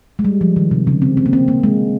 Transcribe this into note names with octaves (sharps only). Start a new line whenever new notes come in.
G#3
G3
F3
D#3
C3
C#3
C4
C4
A#3
C4
A#3
G#3